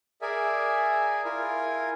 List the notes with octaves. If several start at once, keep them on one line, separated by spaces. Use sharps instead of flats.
G#4 A#4 D5 E5 G#5
E4 F4 A#4 G#5